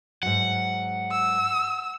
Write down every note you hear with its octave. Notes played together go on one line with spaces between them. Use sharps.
G#2 F#3 F#5
E6